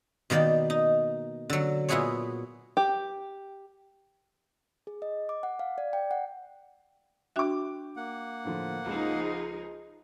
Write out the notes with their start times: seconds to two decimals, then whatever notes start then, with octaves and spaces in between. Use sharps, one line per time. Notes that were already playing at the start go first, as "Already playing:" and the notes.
0.30 B2 D#3 A#3 D5 G5
0.70 D#4
1.50 D3 F#3
1.89 A#2 B3 E4 F#4 G#4 C#5
2.77 G4
4.87 G#4
5.02 D#5
5.29 D6
5.43 F#5
5.59 F5
5.78 D5
5.93 G5
6.11 F#5
7.36 D4 F#4 E5 G5 D6
7.96 A#3 F#5
8.45 A2 D3 F3
8.85 C#2 F3 D#4 G#4